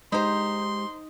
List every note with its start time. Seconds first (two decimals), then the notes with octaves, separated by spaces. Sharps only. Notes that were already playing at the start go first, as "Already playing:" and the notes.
0.12 G#3 D#4 G4 C5 C6